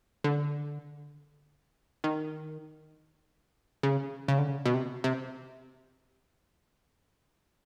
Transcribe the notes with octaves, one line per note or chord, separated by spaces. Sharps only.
D3
D#3
C#3
C#3
D3
C#3
B2
C3
C3